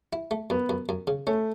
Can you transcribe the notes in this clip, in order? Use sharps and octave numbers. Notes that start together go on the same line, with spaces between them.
E4
A3
F#2 B3
F#2
F#2
C#3
A3 C#4